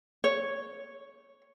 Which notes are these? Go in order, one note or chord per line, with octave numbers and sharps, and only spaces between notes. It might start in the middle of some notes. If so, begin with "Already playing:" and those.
C#5